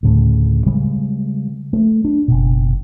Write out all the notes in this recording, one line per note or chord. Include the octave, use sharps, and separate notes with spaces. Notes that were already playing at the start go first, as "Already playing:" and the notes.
D2 A2 C#3
C#3 G3 G#3
A3
D4
F#1 B2